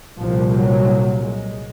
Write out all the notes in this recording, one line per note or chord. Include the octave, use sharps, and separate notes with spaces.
C2 A#2 F3
F#3
G#3